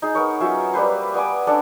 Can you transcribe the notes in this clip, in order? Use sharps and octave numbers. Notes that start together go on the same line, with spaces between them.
D#4 G#4
B3 A#4 C#5
F#3 C#4 F4 E5
G3 A#3 B4 C5
B3 D5 G#5 D6
C#4 D4 A4 A5